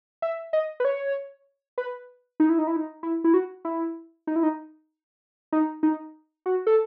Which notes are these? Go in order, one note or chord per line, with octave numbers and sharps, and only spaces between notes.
E5
D#5
B4
C#5
B4
D#4
E4
D#4
E4
D#4
E4
E4
F#4
E4
D#4
E4
D#4
D#4
D#4
F#4
A4